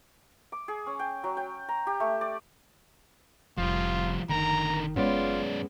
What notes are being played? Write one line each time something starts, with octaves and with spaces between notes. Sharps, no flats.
D6
G#4
C#4
G5
F#3
G5
A#5
G4
A3
D5
F1 F3 G3 C#4 F4
F#1 D3 D#3 A#4 A#5
F#2 G#3 B3 C#4 F4 D5